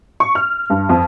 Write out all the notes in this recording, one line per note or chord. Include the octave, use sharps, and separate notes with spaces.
C#6
F6
G2
F2